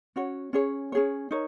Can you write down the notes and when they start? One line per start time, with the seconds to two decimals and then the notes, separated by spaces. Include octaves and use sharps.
0.16 C#4 F#4 C#5
0.53 C#4 G#4 C#5
0.92 C#4 G#4 C#5
1.31 D#4 A#4 C#5